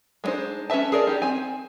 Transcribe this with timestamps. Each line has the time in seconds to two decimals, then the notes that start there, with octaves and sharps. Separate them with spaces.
0.24 G#3 A#3 D4 D#4 C5
0.70 C#4 F#4 B4 E5 A5
0.92 G#4 A#4 D5
1.07 D#4 G4
1.22 C4 G#5